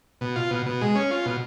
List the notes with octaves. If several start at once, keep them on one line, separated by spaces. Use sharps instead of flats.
B2
F4
B2
B2
G#3
C#4
F4
B2